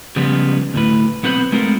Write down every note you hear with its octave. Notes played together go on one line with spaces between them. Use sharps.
C#3 F3 G3 G#3 B3 F4
D2 A2 B4
B1 B3 C4 B4 C5 B5
G#3 A3 B3 C4 F4 A#4